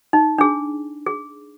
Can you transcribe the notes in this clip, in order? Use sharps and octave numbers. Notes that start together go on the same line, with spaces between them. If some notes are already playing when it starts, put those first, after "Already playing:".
D#4
D4 G#4
G#4